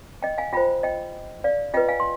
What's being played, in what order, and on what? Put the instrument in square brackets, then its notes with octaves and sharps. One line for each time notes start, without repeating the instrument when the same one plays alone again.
[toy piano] D#5 G5
F5 G#5
F4 C5 G5 B5
D#5 G5
D5 F5
F4 B4 D#5 G5
F5 G#5
C6